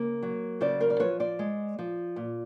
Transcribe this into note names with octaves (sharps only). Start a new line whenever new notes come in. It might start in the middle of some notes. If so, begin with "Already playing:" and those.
Already playing: C#3 A#3
F#3
C#3 C5 D5
A#4 C5
D5
F3 B4 C#5
C5 D5
G#3
F3
A#2